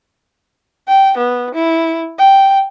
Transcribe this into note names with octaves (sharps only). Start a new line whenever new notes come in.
G5
B3
E4
G5